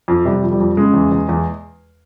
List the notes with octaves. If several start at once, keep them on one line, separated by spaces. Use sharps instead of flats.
F2
C3 G3
F2
G3
F2
C#3 G#3
E2
E2
E2